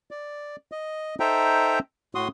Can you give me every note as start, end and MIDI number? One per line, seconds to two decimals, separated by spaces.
0.11 0.56 74
0.72 1.15 75
1.20 1.79 63
1.20 1.79 69
1.20 1.79 72
1.20 1.79 76
1.20 1.79 79
1.20 1.79 82
2.15 2.28 45
2.15 2.28 66
2.15 2.28 84
2.15 2.28 87